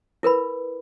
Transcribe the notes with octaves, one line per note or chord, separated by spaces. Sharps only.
E4 A#4 B4 B5